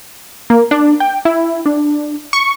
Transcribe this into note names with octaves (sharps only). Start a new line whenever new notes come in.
A#3
D4
G5
E4
D4
C#6